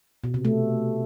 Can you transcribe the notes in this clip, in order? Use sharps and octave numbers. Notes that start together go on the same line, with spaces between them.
B2
C3
A3